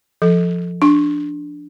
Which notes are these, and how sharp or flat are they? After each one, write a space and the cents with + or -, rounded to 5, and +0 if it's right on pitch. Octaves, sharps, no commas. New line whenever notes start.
F3 +0 A4 +0
D4 +0 C6 +30